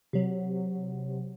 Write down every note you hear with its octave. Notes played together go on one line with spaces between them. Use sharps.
C3 F#3